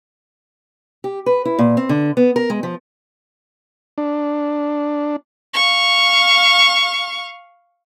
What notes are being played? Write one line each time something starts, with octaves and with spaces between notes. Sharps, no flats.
G4
B4
E4
A#2
C4
D3
B3
A#4
G#3
F3
D4
F5 C#6